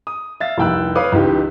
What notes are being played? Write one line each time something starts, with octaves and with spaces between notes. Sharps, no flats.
D#6
E5 F5 A6
F1 C2 G5 E6 F#6
B4 C#5 F5 D6 D#6
C#2 E3 D#4 G4